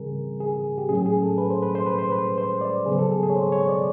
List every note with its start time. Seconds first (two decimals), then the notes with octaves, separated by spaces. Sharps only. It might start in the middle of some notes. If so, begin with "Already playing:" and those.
Already playing: C#3 E3 G3 C4 G#4 A#4
0.40 G#4
0.78 G4
0.89 A2 F#3 A3 C#4 G#4
1.06 G#4
1.23 A4
1.38 B4
1.50 C5
1.62 B4
1.75 C5
1.86 B4
1.99 C5
2.12 B4
2.38 C5
2.61 D5
2.86 C#3 F#3 B3 G#4
2.99 A4
3.11 G#4
3.23 G#4
3.30 C#5
3.35 C5
3.52 C#5
3.68 D5